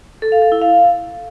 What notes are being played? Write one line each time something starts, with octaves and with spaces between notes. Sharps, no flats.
A4
F5
A4
E4
F5